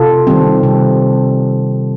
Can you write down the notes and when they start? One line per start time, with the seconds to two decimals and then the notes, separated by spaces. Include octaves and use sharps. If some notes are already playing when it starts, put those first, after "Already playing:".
Already playing: C3 F4 A4
0.27 D#3 G3 C4
0.63 C3